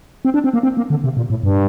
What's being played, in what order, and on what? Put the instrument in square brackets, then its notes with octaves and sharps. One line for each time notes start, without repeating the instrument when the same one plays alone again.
[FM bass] C4
D4
C4
A#3
C4
A#3
D3
C3
A#2
A2
G2